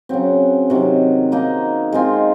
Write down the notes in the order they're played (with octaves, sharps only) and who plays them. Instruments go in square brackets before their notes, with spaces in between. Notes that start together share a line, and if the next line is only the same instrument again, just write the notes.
[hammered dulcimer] C#3 F#3 C4
C3 D#3 F#3
A#3 D#4 A#4 D#5
G#3 C4 F4